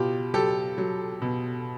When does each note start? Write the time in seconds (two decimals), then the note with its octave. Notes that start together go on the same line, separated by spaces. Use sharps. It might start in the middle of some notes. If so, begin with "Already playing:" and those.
Already playing: B2 F4 G4
0.34 F#3 G4 A4
0.78 F#3
1.22 B2